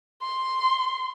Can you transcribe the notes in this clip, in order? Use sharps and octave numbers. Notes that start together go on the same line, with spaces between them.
C6